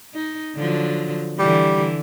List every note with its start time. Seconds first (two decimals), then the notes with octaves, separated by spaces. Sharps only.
0.14 D#4
0.56 D3 F3 F#3
1.39 D3 E3 G3